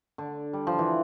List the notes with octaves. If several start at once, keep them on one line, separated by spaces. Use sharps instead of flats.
D3
G3
F3
E3